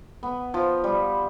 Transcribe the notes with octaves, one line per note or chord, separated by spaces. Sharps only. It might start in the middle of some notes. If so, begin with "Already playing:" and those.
B3
F3
G3